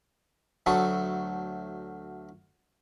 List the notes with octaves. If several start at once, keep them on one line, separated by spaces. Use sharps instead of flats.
D2 F#3 A3 A4 C#6 D#6